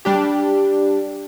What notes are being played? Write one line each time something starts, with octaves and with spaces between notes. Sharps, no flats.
G3 D4 G4